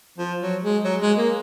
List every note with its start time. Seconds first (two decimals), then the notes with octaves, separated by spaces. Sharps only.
0.18 F3
0.41 F#3
0.63 G#3
0.84 F#3
1.01 G#3
1.18 A#3